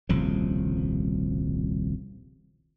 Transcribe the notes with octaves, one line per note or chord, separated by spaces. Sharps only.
D#1 C2 C#3 F3